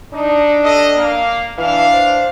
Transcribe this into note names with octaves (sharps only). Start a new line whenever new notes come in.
D4 D#4
G4 A4 D#5
A#3 F5
E3 D4 F5
C5